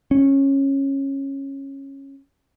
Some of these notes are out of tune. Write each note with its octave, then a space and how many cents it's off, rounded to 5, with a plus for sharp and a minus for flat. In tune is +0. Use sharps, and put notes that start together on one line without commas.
C#4 -15